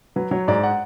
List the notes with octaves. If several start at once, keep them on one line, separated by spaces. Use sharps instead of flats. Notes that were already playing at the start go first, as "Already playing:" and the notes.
F#3 B4
F#3 C#5
G#2 D5
F#5